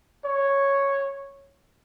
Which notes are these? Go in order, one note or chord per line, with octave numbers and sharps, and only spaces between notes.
C#5